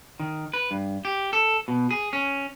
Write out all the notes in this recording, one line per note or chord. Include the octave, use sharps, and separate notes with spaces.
D#3
B4
G2
G4
A4
B2
G#4
C#4